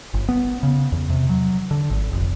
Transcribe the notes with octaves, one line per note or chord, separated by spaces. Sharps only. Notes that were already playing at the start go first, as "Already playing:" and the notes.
G1
B3
C#3
E2
C3
F#3
D3
G#1
F1